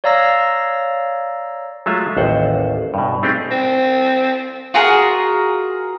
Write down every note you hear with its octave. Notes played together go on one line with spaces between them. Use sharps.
C#5 D5 F5 A#5 E6 A#6
F#3 G#3 A3 F4 E5
A1 D#2 C5 F#5
G2 B2
A3 C4 D4 D#4 G4 G#4
C4
F4 F#4 G#4 A#4